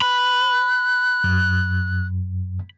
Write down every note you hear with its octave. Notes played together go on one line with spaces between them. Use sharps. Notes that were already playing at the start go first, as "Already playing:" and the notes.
B5 F#6
F#2